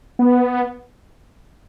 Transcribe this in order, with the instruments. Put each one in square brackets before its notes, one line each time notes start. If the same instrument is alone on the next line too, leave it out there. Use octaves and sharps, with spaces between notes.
[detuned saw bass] B3